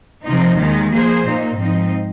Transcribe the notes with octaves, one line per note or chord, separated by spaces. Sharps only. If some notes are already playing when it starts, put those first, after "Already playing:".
C3 F3 C4 D#4
D#2 D#3 G#3 D#4
F3 A#3 G#4 C5
A#2 A#3 D#4
G#2 F3 C4 D#4